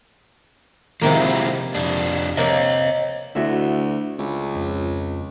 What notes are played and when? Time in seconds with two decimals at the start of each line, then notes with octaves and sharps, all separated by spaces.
1.02 C3 D#3 F3 G#3 A#3 E4
1.75 F2 D4
2.37 C3 A#3 C#5 D#5
3.35 D2 E4 F#4 E5
4.19 C#2
4.55 F2